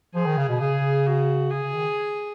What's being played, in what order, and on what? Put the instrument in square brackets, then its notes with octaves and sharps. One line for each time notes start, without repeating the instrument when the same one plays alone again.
[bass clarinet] F3 [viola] G#4
[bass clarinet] D#3
C#3
B2
[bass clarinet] C#3 [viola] G#4
[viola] F#4
[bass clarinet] C#3 [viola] G#4
[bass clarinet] C#3
D#3